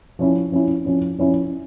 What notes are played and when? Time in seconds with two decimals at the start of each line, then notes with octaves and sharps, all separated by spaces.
0.19 F3 C#4 E4
0.52 F3 C#4 E4
0.85 F3 C#4 E4
1.18 F3 C#4 E4